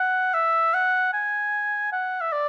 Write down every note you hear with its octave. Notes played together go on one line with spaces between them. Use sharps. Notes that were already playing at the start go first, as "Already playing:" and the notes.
Already playing: F#5
E5
F#5
G#5
F#5
E5
D5